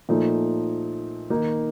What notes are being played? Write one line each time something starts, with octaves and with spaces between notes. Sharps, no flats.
A#2 F3 A3 D#4
D#3 A#3 D#4